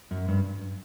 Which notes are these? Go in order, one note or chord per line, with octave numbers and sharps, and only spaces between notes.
F#2
G2